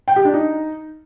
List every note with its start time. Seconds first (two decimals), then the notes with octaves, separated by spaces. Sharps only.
0.08 G5
0.16 G4
0.25 D4
0.34 D#4